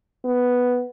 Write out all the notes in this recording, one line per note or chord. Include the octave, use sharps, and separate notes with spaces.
B3